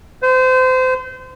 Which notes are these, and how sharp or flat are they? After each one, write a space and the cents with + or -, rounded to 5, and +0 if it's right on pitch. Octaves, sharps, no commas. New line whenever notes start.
C5 -30